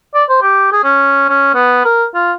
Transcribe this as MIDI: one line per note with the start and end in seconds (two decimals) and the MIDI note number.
0.14 0.24 74
0.29 0.41 72
0.42 0.71 67
0.72 0.83 68
0.84 1.28 61
1.29 1.51 61
1.54 1.83 59
1.84 2.06 70
2.14 2.32 65